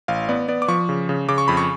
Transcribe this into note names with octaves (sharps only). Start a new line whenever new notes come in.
A1 F5
B3 D5
B3 D5
D6
F3 C#6
C#3
C#3
C#3 D6
C#6
F2 B5
C#6